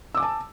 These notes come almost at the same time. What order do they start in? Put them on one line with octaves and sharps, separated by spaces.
E6 D6 G#5 A5